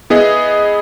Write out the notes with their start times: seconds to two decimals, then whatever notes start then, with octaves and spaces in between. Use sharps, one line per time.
0.10 B3 E4 G#4 D#5